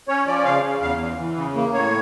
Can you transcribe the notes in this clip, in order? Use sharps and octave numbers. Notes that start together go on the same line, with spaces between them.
C#4 C#5
F3 D5
C#3 F5
C#3
E2 F5
E3
E3
C#3
A#3
A2 C#5